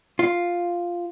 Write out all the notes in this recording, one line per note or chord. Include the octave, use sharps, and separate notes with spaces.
F4